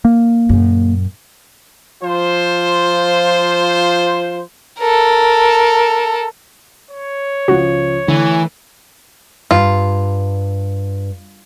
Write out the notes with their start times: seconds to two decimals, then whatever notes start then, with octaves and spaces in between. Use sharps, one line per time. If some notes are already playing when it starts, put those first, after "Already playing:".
0.05 A#3
0.49 F#2 A#2
2.03 F3 F4 C5
4.79 A4 A#4
6.91 C#5
7.48 C#2 F3 F#4
8.08 D3 E3 A3
9.51 G2 F4